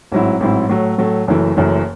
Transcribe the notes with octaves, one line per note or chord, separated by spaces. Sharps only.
A1 G#2 F#3 C4 E4
A1 G#2 F#3 C4 E4
A2 F#3 A3
A2 F#3 A3
F#1 F#2 E3 A3
F#1 F#2 E3 A3